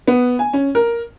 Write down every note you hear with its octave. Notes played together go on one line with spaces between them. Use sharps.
B3
G#5
C#4
A#4